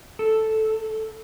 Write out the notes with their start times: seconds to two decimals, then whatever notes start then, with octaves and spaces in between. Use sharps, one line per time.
0.19 A4